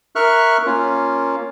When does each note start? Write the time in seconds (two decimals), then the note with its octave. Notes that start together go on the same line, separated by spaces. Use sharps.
0.16 A#4 E5 C#6 F6 F#6
0.66 A#3 C#4 F4